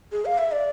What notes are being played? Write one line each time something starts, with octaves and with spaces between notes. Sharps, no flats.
G#4
F5
E5
D5